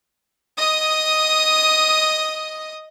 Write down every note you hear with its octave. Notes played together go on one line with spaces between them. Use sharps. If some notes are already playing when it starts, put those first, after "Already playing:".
D#5 D#6